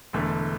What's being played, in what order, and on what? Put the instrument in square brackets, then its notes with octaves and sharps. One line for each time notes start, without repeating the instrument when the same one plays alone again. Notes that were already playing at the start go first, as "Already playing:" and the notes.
[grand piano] E1 E2 D3 A3